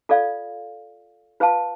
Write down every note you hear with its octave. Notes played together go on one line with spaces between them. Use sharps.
F4 A4 D5 F5
F4 B4 F5 A5